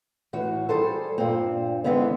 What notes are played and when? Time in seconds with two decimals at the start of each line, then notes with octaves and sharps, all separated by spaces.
0.33 A2 E3 F#4
0.69 G3 G#4 A4 C5
1.18 G2 A#2 C4
1.84 D3 E3 G#3 B3 C4